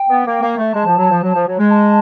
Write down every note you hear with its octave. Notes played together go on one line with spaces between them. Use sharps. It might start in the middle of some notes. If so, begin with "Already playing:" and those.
Already playing: G5
B3
A#3
A#3
A3
G#3 A5
F3
F#3
F3
F#3
F3
F#3
G#3
A5